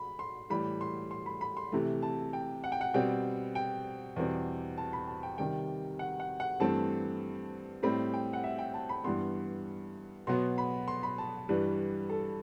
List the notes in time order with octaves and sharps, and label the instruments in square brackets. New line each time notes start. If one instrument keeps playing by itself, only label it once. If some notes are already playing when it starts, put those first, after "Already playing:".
Already playing: [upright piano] B5
C6
A2 E3 G3 B5
C6
C6
B5
B5
C6
C3 E3 A3
A5
G5
F#5
G5
F#5
B2 G3 C4 G5
G5
E2 B2 G3 C4
A5
B5
A5
G5
C3 D#3 G3 G5
F#5
F#5
F#5
G2 E3 A3 C4 A5
A2 G3 C4 B5
G5
F#5
E5
G5
A5
B5
G2 E3 G3 B3 C6
B2 F#3 B3 C6
B5
C6
B5
A5
G2 E3 G3 B4
A4